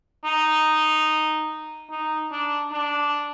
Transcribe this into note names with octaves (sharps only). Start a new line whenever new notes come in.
D#4
D#4
D4
D4